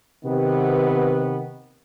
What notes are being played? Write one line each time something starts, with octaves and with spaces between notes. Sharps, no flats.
C3 D#3 B3